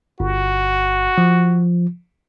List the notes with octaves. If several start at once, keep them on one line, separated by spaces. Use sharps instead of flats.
G1 F#4
F3